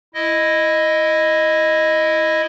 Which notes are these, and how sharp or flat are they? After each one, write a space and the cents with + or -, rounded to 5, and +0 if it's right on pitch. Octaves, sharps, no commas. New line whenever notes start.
E4 +0 D#5 +0